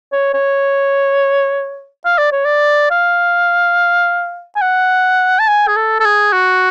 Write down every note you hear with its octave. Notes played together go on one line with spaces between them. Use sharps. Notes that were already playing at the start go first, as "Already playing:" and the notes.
C#5
C#5
F5
D5
C#5
D5
F5
G#5
F#5
A5
G#5
G#4
A4
A4
G#4
F#4